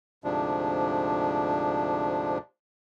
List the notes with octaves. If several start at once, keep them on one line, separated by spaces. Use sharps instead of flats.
D2 G#2 C3 F3 D4